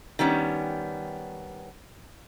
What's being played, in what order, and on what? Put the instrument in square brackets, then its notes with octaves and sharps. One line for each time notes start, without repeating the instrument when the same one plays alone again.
[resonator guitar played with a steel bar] D#3 G3 B3 C#4